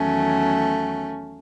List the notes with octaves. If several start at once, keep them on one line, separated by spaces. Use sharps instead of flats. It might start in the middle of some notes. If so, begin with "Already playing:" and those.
Already playing: E2 D#3 F#3 A3 C#4